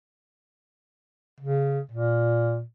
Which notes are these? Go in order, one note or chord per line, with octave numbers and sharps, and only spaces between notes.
C#3
A#2